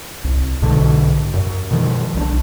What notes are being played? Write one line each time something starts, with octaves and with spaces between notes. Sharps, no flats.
C2
B1 G#2 B2 D3
F#2
B2 D#3 F3
B1 F3 D4